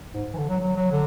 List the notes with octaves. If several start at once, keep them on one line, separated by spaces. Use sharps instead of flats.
G#2
E3
D3
F#3
F#3
F#3
D3